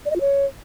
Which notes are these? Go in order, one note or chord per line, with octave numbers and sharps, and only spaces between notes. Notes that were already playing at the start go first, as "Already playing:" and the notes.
D5
D#5
F4
C#5